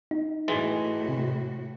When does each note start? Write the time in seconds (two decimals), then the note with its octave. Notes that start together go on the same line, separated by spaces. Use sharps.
0.11 D#4
0.48 A2 E3 G#3 F#4 G#5 A6
1.08 C3